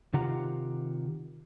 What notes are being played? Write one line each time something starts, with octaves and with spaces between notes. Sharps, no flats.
C3 D#3 F4 G4 F#5 A#5